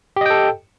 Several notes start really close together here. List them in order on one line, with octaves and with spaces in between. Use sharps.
G4 D#5 G5 A4